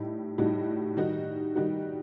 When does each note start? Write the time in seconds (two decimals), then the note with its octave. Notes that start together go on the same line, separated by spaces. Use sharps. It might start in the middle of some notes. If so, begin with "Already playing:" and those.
Already playing: A2 G3 D#4
0.38 A2 G3 D#4 F#4
0.97 D#3 G3 D#4 F#4
1.55 D#3 G3 D#4 F#4